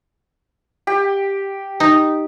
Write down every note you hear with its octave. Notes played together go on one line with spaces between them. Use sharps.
G4
D#4